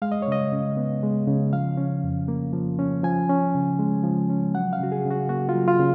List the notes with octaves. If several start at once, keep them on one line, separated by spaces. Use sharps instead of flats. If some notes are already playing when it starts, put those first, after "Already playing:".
G#3 F5
D#5
C#5
C#3 D#5
C#3
B3
G#3
C#3
F3 F5
C#4
F2
A#3
F3
C#4
F3 G#5
C#4
C#3
G#3
F3
C#4
F#3 F#5
F5
C#3 F#4
G#4
C#3
F#4
A#3 F#4
F4
F#3
F4
C#3